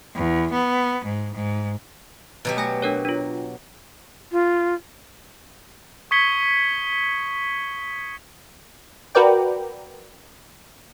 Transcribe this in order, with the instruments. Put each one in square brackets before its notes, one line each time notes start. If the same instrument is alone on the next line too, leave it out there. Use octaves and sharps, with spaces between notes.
[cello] E2
B3
G#2
G#2
[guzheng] B2 F#3 G4
[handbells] A3 G#5 A#6
D4 A#4 C#5
D4 F4
[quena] F4
[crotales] C#6 D#6 G#6 B6 C#7 G7
[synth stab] F#4 A#4 B4 D5 G5